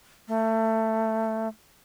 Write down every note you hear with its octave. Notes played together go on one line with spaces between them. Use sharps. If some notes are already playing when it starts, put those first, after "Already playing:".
A3